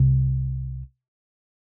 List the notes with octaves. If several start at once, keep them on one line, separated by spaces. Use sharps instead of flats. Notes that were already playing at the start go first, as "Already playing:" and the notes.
Already playing: C2 C3